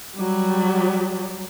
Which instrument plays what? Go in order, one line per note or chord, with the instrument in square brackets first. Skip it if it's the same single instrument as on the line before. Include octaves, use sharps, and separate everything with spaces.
[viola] F#3 G3